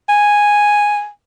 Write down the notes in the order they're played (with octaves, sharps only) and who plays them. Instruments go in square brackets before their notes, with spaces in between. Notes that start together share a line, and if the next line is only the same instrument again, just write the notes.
[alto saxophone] G#5